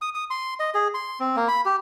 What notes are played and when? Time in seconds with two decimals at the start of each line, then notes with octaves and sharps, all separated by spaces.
0.02 D#6
0.15 D#6
0.30 C6
0.60 D#5
0.74 G#4
0.94 C6
1.20 C4
1.36 A#3
1.48 B5
1.65 G4